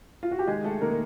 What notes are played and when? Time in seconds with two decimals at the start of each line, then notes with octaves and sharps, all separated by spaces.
0.23 F4
0.31 F#4
0.39 G4
0.47 D#3 G#3 G#4
0.64 A3 A4
0.81 D#3 A#3 A#4